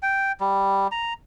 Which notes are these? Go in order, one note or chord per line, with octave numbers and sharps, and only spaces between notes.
G5
G3
A#5